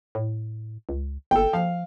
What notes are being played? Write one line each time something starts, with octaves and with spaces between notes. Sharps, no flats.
A2
C#2
G1 A4 G5
F3 F5